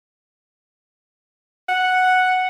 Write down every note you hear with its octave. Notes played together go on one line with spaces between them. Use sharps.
F#5